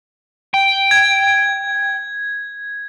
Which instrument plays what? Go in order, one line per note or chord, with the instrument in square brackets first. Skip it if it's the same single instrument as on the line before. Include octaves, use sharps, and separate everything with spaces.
[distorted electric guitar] G5
[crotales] G#6